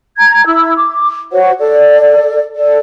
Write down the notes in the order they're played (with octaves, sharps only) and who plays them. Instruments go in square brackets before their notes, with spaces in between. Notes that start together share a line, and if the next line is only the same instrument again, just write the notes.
[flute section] A#5 G#6
E4 E6
D6
F#4 C5 C#5 F#5
A4 D5
A4 D5